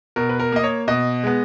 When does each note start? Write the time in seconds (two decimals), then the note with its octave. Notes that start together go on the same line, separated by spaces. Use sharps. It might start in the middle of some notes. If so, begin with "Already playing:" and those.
0.16 B2 A#4
0.29 B4
0.40 A#4
0.52 A#3 D#5
0.64 C#5
0.88 B2 D#5
1.24 G#3 B3